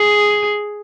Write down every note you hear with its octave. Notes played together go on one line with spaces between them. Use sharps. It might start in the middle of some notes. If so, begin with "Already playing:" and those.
Already playing: G#4